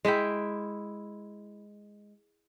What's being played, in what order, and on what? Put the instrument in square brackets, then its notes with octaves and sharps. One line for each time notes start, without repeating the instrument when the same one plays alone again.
[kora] G#3 E4 E5 G5